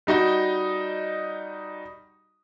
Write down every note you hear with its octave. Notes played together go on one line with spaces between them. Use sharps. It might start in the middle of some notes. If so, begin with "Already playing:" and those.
G3 D#4 F#4 D#5